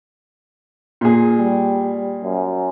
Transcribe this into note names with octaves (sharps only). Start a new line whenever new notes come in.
A#2 G#4
G3
F#2